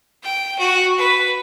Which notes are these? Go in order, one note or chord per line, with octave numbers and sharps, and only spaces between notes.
G5
F#4
B4